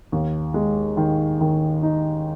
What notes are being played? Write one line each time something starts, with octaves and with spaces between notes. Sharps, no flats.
D#2
G#3
D#3
D#3
D#4